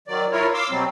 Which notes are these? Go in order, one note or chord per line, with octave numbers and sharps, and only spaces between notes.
D#3 F#3 D5
E4 F4 A#4 C#5
F5 C6 D6 E6
B2 F#3 G3 C4